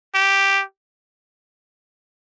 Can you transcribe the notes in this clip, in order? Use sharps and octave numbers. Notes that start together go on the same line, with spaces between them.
G4